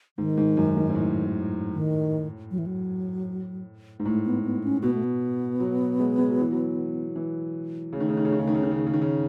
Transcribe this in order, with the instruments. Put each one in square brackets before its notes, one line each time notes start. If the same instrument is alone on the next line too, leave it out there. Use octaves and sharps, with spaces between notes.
[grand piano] G#2 [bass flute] D#3
[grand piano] G#2
F#2
G#2
G#2
A2
[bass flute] D#3
F#3
E3
F#3
[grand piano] G#2
[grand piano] A2 [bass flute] A3
[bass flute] B3
B3
C#4
[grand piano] B2 [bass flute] B3
[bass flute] A3
B3
[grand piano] F#3
G#3
G#3
F#3
E3
F#3
E3
[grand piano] C#3 [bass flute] A3
[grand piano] D#3
C#3
D#3
C#3
D#3
C#3
D#3
C#3
D#3
C#3
D#3
C#3
D#3
C#3